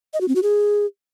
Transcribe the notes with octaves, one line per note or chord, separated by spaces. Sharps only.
D#5
F#4
C4
F#4
G#4